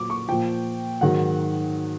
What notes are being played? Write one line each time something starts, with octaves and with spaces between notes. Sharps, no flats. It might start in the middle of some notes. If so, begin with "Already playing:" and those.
Already playing: A#2 F#3 D6
C#6
A#2 F3 G5
G#2 D#3 F#3 F#5